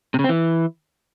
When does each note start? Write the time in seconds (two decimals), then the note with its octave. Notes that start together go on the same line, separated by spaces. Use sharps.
0.14 C3
0.19 C#3
0.24 C4
0.29 E3